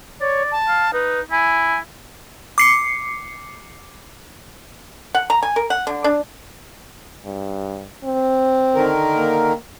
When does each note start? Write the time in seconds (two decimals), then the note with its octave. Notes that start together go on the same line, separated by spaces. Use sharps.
0.21 C#5 D5
0.51 A5
0.68 F5
0.93 D#4 B4
1.31 E4 G#5
2.58 D6 C7 C#7
5.15 F#5
5.30 A#5
5.43 G#5
5.56 A#4
5.70 F#5
5.87 D3
6.04 D4
7.25 G2
8.04 C4
8.75 D3 D#3 A#4
9.17 A#3